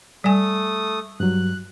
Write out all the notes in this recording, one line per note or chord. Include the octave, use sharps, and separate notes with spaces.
G3 A3 G#5 D#6
G2 F#3 F#6